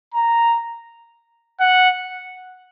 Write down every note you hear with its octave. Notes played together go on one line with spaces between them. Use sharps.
A#5
F#5